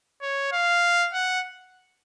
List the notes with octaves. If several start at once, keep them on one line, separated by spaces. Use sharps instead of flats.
C#5
F5
F#5